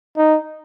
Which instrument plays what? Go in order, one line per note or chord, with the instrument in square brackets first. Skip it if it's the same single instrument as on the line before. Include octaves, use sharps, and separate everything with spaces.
[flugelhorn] D#4